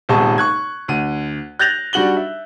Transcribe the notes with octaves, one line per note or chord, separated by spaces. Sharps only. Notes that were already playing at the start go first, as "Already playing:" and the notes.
D#1 C3 G#3 B3 A5 C#6
C#6 F#6 G#6
D2 D#7
F#6 G6 A6 A#6 F7 F#7
G3 D4 F#4 F#7 G7
E5